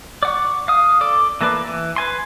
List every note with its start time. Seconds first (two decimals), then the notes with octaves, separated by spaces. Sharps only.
0.23 D5 F#5 C#6
0.68 F5 D#6
1.01 A4 D5
1.41 E3 A#3 A4 B4 D5
1.66 E3
1.96 B4 G#5 C6